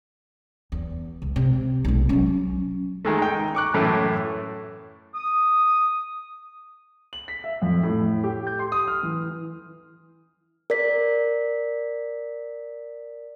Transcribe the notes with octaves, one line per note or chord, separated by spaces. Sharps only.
E2
C#2
C3
B1 G#3
F#3 C#4
D#3 G#3 A3
D#4 G5
C#6 D6 F#6
F#2 A2 E3 A3 C#4 E4
D#6
F#7
B6
E5
F2
A2
G4
G6
C6
D#6
F6
E3
A#4 D5 B6